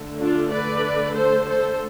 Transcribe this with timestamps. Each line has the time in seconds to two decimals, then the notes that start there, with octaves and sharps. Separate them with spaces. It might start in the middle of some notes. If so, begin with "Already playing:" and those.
Already playing: D3 A3
0.20 D4 F4
0.51 B4 D5
1.15 A4 C5
1.47 A4 C5